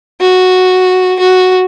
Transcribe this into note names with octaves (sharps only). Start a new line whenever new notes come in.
F#4
F#4